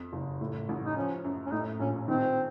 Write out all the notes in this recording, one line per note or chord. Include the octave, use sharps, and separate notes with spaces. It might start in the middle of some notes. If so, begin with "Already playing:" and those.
Already playing: F2
F#1
A2
A1
D#4
F3 C#4
F#2
C#4
A2 D#4
A#1 C#4
D#3 C4